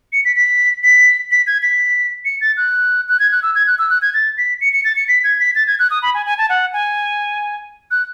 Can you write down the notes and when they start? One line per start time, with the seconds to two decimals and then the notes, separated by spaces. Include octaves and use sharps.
0.13 C#7
0.25 B6
0.37 B6
0.84 B6
1.31 B6
1.47 G#6
1.63 B6
2.25 C#7
2.41 A6
2.57 F#6
3.09 F#6
3.20 G#6
3.32 F#6
3.43 E6
3.55 G#6
3.67 F#6
3.79 E6
3.90 F#6
4.02 G#6
4.14 A6
4.38 B6
4.61 C#7
4.73 C#7
4.84 A6
4.96 C#7
5.08 B6
5.24 G#6
5.40 B6
5.55 A6
5.67 G#6
5.79 F#6
5.91 D#6
6.02 B5
6.14 G#5
6.26 G#5
6.38 A5
6.49 F#5
6.73 G#5
7.91 F#6